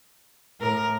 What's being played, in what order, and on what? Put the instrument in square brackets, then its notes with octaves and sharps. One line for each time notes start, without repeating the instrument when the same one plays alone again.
[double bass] A2 [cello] A#4